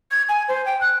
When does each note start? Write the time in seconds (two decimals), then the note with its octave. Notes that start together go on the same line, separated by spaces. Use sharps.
0.11 G#6
0.29 G#5
0.48 C5
0.66 G5
0.81 F#6